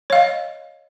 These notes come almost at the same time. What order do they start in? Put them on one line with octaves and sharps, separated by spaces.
C#5 F5 D#5